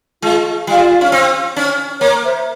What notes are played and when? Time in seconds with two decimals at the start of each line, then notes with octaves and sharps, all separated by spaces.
0.22 G#3 F4
0.67 G3 F4
1.01 C#4
1.12 C4
1.56 C#4
2.01 A#3 A#4 C#5
2.23 C5 E5